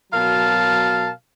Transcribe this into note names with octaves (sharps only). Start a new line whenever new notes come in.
B2 F#3 A#4 F5 A5